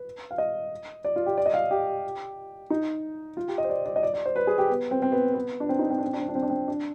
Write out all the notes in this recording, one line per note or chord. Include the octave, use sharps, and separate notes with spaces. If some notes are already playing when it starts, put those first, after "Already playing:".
Already playing: B4
F5
D#5
D5
F4
G4
D5
D#5
F5
G4
D#4
F4
G4
D#5
C5
D5
D5
D#5
D5
D5
C5
B4
G#4
G4
B3
C4
C4
B3
B3
D4
C4
D#4
C4
D4
C4
D4
C4
D4
C4
D4
C4
D4